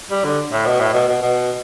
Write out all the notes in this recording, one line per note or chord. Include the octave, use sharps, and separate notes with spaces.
G3
D3
A2
B2
A2
B2
B2
B2